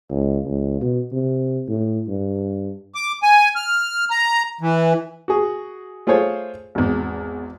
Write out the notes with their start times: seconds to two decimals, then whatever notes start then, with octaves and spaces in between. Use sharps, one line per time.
0.10 C#2
0.45 C#2
0.81 B2
1.13 C3
1.69 A2
2.08 G2
2.95 D6
3.23 G#5
3.56 F6
4.11 A#5
4.61 E3
5.28 F#4 G#4
6.07 A3 F4 G#4 C5 C#5
6.75 G#1 E2